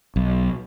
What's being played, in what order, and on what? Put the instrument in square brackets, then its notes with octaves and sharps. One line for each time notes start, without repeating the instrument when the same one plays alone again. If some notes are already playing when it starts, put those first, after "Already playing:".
[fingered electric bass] B1